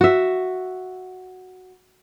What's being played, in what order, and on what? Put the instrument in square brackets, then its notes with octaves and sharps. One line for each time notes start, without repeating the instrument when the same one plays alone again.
[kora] F#4 E5